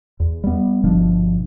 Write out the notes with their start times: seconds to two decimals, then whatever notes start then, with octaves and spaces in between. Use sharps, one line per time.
0.20 E2
0.44 G3 B3
0.83 G1 B2 F3 D4